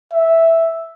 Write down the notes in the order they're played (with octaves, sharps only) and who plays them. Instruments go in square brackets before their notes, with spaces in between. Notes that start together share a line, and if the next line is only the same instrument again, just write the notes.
[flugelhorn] E5